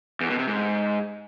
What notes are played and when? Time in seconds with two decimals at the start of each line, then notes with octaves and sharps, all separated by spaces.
0.21 E2
0.30 B2
0.39 C3
0.48 G#2